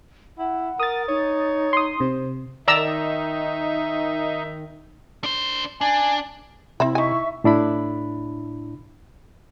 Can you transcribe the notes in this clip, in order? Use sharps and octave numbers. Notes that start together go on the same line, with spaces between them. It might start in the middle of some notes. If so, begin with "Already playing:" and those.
E4 F#5
A#4 D#6 A6
D#4 C#5
C6 D#6
C3 C5
D#3 D#4 D5 E5 A#5 E6
D4 C5
D4 G#5
C3 C4 E4 E5 B5
D#4 E5 G#5 C#6
A2 D4 E4 B5